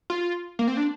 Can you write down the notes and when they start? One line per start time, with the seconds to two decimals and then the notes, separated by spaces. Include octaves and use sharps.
0.10 F4
0.59 A#3
0.68 C4
0.77 D4